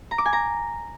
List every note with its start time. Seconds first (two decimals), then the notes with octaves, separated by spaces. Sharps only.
0.11 A#5
0.18 D6
0.26 G#5
0.33 A#5